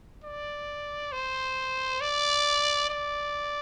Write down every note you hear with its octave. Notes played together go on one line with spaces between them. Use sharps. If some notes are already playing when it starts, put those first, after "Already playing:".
D5
C5
D5
D5